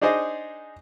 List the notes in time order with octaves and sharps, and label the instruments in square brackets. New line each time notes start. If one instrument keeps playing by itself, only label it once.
[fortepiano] D4 D#4 G#4 C5 D5 D#5